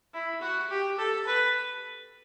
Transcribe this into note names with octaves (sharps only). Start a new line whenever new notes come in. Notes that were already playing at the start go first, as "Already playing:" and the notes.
E4
F#4
G4
A4
B4